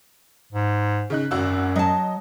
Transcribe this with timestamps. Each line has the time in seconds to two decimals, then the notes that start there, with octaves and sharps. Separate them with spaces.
0.53 G#2
1.10 C#3 D#4 F#6
1.31 G#1 F#2 F#4 E6
1.76 F#3 D#5 A5